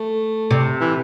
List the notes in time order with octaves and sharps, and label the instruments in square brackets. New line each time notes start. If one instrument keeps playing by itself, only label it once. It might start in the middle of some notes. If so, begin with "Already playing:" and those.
Already playing: [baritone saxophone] A3
[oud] C3
[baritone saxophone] E3